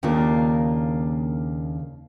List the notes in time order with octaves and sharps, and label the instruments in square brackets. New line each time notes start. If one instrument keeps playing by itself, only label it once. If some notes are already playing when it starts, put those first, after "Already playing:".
[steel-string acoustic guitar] D#2 C#3 A#3 D4 F4 A#4